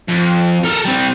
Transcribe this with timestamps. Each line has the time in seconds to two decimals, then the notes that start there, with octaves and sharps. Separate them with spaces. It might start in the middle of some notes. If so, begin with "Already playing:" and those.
0.08 F2
0.64 A4 A#4
0.85 G3 C4